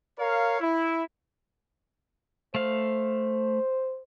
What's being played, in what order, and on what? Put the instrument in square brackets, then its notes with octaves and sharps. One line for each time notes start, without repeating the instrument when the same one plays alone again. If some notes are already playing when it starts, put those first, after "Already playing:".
[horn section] A#4 C#5 F5
E4
[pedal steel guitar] A3 F5 [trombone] C5